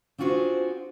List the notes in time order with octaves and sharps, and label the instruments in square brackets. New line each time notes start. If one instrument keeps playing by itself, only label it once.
[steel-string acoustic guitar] C4 D4 F4 F#4 G#4 C5